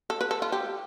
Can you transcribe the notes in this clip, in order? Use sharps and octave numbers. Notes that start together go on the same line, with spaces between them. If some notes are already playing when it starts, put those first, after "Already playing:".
A4
B4
A4
F4
G4